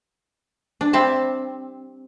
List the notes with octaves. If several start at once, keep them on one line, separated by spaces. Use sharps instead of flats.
D4
G3 C4 E5 A5